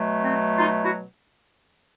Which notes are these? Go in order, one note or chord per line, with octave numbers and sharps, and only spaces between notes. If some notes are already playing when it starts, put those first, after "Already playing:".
Already playing: B2 F#3 A3
C4
D#4 F4
E4 F#4